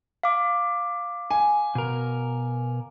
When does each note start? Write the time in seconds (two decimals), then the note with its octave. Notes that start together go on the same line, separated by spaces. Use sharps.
0.23 F5 D6
1.31 G#5
1.75 B2 A#4